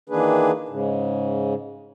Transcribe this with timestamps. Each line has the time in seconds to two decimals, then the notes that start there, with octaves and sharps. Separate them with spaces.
0.09 D#3 E3 A#3 D4 G#4 B4
0.69 G#2 C#3